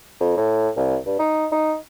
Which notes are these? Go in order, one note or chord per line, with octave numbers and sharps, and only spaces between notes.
F2
A2
C2
G2
D#4
D#4